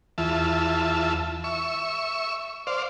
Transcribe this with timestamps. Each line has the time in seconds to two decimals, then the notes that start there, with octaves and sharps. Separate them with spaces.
0.18 E2 E3 F4 E5 A5
1.44 E5 C#6
2.67 C5 D5 F5